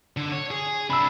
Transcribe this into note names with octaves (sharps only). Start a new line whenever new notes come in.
D3
C#5
G#4
C3 D4 B5 E6